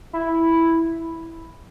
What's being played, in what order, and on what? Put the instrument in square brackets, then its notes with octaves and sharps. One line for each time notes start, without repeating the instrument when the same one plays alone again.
[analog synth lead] E4